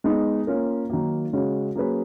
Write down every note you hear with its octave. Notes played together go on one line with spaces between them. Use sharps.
G#3 B3 D#4
A#3 C#4 F4 A#4
D#3 F#3 A#3
C#3 G#3 C#4 F#4
F#3 A#3 C#4 G#4 B4